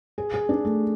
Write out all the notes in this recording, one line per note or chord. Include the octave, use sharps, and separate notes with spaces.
G#4
G#4
D4
A3